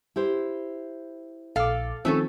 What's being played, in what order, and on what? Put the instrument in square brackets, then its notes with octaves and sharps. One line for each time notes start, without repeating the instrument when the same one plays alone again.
[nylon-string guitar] E4 G4 C5
[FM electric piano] A#1 D6 [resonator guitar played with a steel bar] A4 F5
[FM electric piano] D#3 F3 C4 [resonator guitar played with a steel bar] A3 C#4 A4